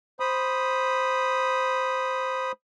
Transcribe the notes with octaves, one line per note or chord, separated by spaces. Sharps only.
C5 B5 D#6